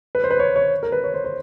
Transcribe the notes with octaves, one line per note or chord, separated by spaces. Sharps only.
B4
C5
B4
C#5
C#5
A#4
B4
C#5
C5
C5